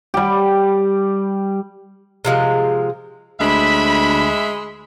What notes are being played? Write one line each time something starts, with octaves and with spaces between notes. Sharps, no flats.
G3 G4
C3 F3 G#3 A#4
D2 G#3 E5 B5